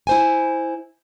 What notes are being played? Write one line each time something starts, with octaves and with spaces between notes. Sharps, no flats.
E4 C5 G#5